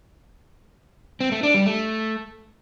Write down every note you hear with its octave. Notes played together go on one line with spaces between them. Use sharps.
C4
A3
D4
G3
A3